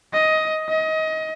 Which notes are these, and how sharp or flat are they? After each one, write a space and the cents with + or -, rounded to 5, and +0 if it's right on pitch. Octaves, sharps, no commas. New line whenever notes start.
D#5 +15
D#5 +25